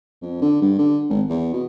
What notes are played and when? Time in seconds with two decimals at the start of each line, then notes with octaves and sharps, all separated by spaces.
0.22 F2
0.42 D3
0.62 G2
0.79 D3
1.10 G#1
1.29 E2
1.53 B2